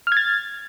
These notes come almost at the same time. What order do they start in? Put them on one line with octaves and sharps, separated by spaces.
F6 G#6 A6